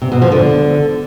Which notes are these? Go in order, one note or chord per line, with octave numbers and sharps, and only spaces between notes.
C3
B2
F3
D3